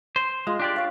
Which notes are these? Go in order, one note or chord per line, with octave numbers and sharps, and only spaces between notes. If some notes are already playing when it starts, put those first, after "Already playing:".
C5
G#3 F4
D4 G4 D5
C#5 F5